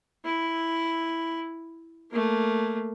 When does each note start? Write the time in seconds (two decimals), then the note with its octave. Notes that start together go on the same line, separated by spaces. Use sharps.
0.25 E4
2.11 A3 A#3